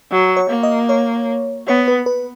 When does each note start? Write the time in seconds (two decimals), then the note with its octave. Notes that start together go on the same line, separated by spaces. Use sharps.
0.12 F#3
0.37 C#5
0.50 A#3
0.63 D#5
0.89 C#5
1.67 B3 C#5
1.88 B4
2.06 B4